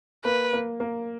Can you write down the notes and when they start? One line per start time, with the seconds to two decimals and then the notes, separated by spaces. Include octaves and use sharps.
0.25 A#3 B4
0.53 A#3
0.80 A#3